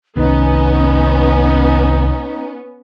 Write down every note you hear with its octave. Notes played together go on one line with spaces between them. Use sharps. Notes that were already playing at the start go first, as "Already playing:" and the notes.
C2 D#3 B3 C#4 D#4